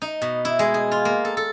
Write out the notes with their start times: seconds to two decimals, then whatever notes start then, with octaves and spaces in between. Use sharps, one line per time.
0.02 D#4
0.22 B2
0.45 E4
0.59 G#3
0.74 G#4
0.92 F4
1.05 A#3
1.25 A4
1.37 A4